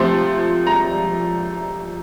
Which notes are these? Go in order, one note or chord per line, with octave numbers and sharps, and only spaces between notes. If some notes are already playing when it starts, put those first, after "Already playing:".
Already playing: C3 F3 A3 C4 C6
A#5